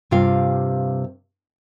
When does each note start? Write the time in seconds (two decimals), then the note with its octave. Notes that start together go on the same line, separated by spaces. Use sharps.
0.11 G2 C3 F4 F5